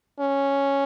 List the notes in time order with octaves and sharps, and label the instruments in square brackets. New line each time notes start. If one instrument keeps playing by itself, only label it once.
[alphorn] C#4